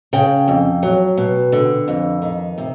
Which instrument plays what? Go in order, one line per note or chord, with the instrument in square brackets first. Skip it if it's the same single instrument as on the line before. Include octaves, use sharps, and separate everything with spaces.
[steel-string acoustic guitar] C#3 G5
F2
F#3
B2
D3
F2
D#3
C3